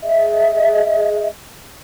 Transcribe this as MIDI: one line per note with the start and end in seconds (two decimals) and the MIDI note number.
0.03 1.27 68
0.03 1.27 75
0.03 1.27 76